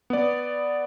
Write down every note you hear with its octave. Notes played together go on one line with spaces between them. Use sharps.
B3 D5